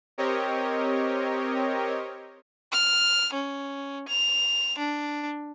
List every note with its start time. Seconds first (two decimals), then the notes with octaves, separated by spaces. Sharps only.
0.18 C4 G4 A#4 C#5 D#5
2.72 F6
3.34 C#4
4.08 F7
4.78 D4